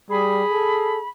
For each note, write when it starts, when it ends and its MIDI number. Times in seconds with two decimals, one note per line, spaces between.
0.10 0.43 55
0.10 1.07 68
0.10 1.09 83
0.51 0.99 69